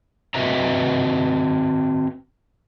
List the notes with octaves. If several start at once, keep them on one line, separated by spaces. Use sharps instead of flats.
C4 F#4 B4 D#5 E5 A#5